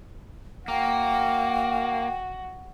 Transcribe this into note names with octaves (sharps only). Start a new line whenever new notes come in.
A#3 F#4 G5